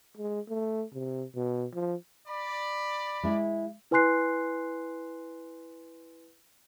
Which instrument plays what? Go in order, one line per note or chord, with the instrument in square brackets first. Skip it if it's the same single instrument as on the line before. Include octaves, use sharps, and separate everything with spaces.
[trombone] G#3
A3
C3
B2
F3
[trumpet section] D5 B5
[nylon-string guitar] G#3 E4
[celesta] E4 B4 G#5 C6 F#6 C7